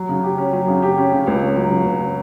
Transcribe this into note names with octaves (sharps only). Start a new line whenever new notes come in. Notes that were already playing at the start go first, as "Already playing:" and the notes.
Already playing: F#3
C#3
G4
C#4
F#3
C#3
G4
C#4
C#3
C#2
C#4
F#3
C#3
C#2
C#4